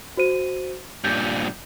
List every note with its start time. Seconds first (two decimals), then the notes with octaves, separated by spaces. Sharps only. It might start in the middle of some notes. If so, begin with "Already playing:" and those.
0.17 F#4 C5 D#7
1.04 G2 A#2 G6